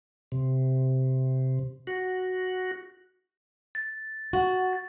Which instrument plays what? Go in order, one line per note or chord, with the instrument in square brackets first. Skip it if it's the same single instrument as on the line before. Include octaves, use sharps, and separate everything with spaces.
[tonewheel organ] C3
F#4
[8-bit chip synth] A6
[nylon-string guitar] F#4